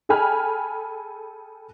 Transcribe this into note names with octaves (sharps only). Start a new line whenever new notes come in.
G#4 A4 G5 G#5 B5 F6